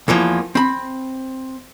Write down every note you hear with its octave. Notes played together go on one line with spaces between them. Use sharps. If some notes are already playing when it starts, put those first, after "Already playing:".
E2 E3 F3 A#3
C4 B5